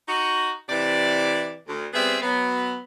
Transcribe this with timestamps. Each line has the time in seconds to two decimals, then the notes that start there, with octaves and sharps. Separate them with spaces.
0.07 D#4 F#4
0.69 C3 E3 D5
1.67 D2
1.93 G3 B3 C4 G#4 E5
2.22 F#3 B3